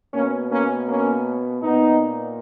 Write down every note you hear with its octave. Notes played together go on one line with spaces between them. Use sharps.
B2 A#3 C#4
A#3 C#4
A#3 C#4
A#2 B3 D#4